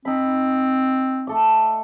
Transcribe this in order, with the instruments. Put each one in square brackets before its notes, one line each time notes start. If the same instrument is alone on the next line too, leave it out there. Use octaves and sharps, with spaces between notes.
[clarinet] C4 [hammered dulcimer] D#4 B5
[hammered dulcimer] A3 A4 D6